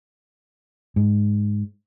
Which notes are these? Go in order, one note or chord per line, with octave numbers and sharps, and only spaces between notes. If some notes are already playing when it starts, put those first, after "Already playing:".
G#2